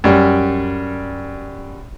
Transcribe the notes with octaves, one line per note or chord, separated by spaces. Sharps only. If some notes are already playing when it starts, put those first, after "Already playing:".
F#2 G3